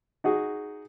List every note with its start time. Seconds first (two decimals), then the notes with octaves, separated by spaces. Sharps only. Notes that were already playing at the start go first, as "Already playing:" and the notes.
0.24 D#4 F#4 G#4